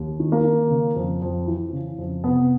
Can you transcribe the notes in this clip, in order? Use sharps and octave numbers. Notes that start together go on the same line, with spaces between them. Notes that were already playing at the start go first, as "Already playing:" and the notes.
Already playing: D#2
D#3
A#3
D#3
C#3
F2
F2
E3
C#3
F2
C3 B3